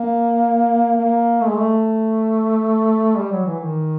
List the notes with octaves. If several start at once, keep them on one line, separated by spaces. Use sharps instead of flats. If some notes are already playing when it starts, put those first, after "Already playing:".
Already playing: A#3
A#3
A3
G#3
A3
G3
F#3
E3
D#3